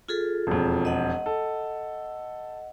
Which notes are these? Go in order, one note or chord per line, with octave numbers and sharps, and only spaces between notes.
F4 G#4 A4
E1 F2
D#5 F#5
A4